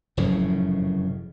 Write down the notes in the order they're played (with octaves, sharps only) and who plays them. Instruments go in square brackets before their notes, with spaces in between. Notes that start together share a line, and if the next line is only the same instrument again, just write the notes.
[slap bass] F1 F#2 A2 C#3